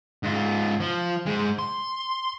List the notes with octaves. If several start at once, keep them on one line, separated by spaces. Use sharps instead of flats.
G#2 F4
F3
G#3 C5
C6